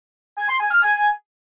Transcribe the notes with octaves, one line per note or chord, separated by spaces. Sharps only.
G#5
C6
G#5
F6
G#5